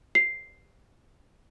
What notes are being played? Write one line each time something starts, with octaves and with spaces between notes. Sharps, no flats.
C7